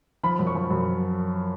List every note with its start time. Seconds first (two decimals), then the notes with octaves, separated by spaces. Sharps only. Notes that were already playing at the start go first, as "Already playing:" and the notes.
0.23 F3 B5
0.39 F#2
0.47 C#6
0.55 F3
0.70 F#2